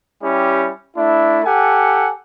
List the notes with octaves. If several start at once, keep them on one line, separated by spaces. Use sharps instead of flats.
G3 C#4 E4 G4
A3 D4 E4
G4 A4 F#5 G#5